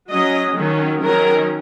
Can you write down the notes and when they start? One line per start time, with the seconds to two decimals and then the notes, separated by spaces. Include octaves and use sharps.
0.11 F#3 C#4 D#5
0.57 D#3 F#3 C#4
1.02 D#3 F#3 C#4 A#4